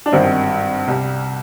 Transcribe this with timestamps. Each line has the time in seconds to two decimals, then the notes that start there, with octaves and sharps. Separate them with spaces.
0.06 D4
0.12 G#1 G2 D#3 G3 C4
0.88 C2 C3 G3